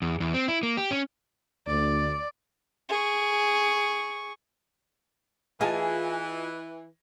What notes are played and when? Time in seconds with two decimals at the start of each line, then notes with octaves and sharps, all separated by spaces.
0.02 E2
0.20 E2
0.34 C4
0.48 E4
0.63 A#3
0.77 G4
0.91 C#4
1.67 D2 D5
2.89 G#4 C#6
5.61 E3 F4 G#4 D#5 G#5 A5